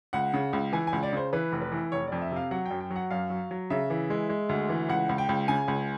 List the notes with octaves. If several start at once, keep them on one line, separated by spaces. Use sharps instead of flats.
C#2 F#5
C#3
C#2
E3 G#5
G#5
C#2
D5
C#3 C5
E3 B4
F1
B4
E3
F1 C#5
F2 D5
E5
C3
F5
F#3 F#5
G5
F#2
G5
F#3
F#5
F#2 F5
F#3
F#3
C#3 E5
E3
G#3
G#3
D2
E3
C#2 F#5
C#2
G5
C#2
C#3 G#5
C#2